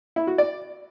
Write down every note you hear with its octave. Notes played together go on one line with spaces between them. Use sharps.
E4
F#4
D5